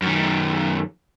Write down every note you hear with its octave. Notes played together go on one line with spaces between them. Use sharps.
F#2 D#3